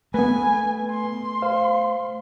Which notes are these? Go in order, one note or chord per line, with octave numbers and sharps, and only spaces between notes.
A3 B3 B4 G#5
C6
C5 F5